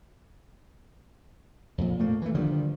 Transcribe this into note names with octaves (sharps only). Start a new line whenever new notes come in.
F2 A#2
A#2 A3 A#3
E3 A3
D3 D#3 F3 G3